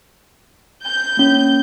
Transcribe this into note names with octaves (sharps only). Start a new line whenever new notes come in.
G6
A#3 C#4